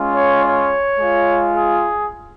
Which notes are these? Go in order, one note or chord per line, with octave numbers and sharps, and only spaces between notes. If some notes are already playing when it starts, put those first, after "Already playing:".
Already playing: G#3 C#4 F4
C#5
C#5
G#3 F4
G#4